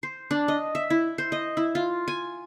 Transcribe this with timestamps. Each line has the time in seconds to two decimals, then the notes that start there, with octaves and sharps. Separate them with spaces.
0.03 C5
0.31 D4
0.48 D#5
0.75 E5
0.90 E4
1.18 C5
1.32 D#5
1.57 E4
1.75 F4
2.08 G#5